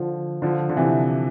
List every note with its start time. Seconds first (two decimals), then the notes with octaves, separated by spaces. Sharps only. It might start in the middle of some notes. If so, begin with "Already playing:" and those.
Already playing: D3 F3
0.42 D3 F3
0.69 D3
0.76 C3 E3